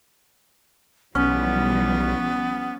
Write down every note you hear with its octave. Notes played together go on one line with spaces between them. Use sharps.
B1 E3 F3 G3 B3 C#4